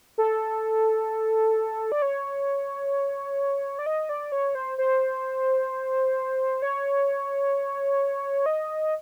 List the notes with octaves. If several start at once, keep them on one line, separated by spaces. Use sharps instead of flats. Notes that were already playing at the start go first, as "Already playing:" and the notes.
A4
D5
C#5
D5
D#5
D5
C#5
C5
C5
C#5
D#5